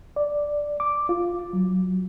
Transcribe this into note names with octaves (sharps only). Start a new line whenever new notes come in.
D5
D6
F4
F#3